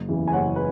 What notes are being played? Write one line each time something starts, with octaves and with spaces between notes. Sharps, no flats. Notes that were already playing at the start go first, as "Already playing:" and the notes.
Already playing: F#1
E2 C#3 E3
G#5
F#1 C#5 F#5
B4